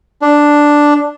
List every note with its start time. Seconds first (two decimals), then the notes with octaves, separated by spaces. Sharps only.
0.22 D4